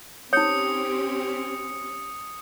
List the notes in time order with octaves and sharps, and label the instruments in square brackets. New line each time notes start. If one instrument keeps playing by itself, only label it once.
[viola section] C4 C#4 G4 [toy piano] D#4 C#5 [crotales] D#6 C#7